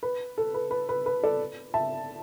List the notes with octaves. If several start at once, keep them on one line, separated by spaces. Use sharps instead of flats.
B4
A4
B4
B4
B4
B4
A4 D5
E5 A5